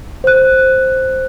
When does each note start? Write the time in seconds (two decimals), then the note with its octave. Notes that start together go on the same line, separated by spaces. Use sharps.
0.24 C5 F#6